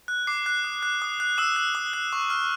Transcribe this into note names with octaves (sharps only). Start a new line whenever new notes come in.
F#6
D6 C7
F#6
D#6
F#6
D#6
F#6
D#6 E6 E7
F#6
D#6
F#6
C#6
F6